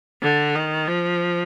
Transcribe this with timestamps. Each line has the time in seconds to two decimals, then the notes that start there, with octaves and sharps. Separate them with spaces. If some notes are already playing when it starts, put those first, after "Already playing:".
0.22 D3
0.55 D#3
0.88 F3